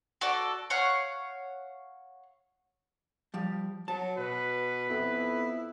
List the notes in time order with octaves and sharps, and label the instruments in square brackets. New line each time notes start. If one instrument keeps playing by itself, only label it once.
[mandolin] F#4 A4 D5
C#5 F5 F#5
[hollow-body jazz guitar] F3 G3
[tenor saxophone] F#3 [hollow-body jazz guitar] A5
[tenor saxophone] B2 [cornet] B4
[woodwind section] F2 B3 [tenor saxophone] E4